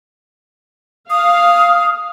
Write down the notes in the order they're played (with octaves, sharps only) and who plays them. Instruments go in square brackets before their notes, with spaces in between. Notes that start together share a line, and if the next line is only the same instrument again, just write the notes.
[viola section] F5 [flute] D#6